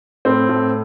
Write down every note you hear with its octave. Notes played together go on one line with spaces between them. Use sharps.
A2 C4
A2